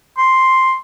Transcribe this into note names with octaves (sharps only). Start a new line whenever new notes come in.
C6